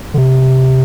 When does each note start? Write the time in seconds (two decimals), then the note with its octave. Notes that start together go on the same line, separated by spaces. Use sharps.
0.14 D3
0.18 C3